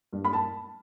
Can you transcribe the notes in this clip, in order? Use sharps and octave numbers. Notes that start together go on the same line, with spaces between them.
G2
B5
A5